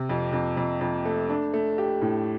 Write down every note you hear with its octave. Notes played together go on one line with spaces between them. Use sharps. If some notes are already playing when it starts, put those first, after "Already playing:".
Already playing: C3
F2
F2
F2
F2
A3
D4
A3
G4
A2